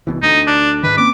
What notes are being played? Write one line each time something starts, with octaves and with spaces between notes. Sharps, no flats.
C2 B2 E3
D2 D#4
D4
G#2 D#3 B4
A#3 C4 C#4 D6